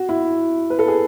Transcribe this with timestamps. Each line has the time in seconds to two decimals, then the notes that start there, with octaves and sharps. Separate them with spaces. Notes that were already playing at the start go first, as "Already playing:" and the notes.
Already playing: F#4
0.09 E4
0.70 B4
0.79 A4
0.88 G#4